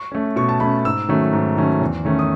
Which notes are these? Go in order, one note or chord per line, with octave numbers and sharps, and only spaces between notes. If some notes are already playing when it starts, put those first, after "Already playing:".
Already playing: C#6
A3 C#4
B2 C#6
A5
A3 C#4 B5
G#2 E6
D#3 F#3 A3 C#4
G#2
D#3 F#3 A3 C#4
E2
D#3 A3 C#4
D#6